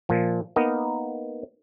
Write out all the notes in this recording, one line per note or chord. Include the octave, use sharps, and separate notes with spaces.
A#2 F3
A#3 B3 D#4 A#4